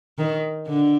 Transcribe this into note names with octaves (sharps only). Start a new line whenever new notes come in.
D#3
D3